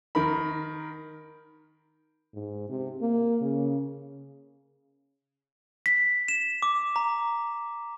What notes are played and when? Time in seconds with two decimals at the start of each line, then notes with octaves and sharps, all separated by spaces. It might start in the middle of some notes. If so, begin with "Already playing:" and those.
0.15 D#3 A#4 B5
2.34 G#2
2.69 C3
3.01 A#3
3.41 C#3
5.86 B6
6.28 E7
6.62 D6
6.96 A#5